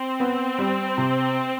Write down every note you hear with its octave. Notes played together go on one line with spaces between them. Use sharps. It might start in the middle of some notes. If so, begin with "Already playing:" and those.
Already playing: C4
B3
G3
C3